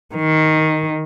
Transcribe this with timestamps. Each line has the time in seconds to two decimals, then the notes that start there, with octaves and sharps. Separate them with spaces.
0.15 D#3